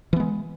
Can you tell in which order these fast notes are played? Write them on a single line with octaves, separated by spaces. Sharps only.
E3 B3 G#3